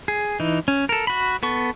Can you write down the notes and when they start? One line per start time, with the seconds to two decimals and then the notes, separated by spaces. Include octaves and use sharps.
0.08 G#4
0.40 E3 D#4
0.68 C#4
0.89 A4 A#4
1.07 F#4 B5
1.43 B3 A4 C#6